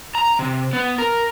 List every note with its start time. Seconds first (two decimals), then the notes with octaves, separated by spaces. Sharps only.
0.15 A#5
0.39 C3
0.73 B3
0.98 A#4